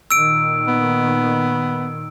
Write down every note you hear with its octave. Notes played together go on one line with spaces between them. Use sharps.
A#2 D#3 E6 D7
B3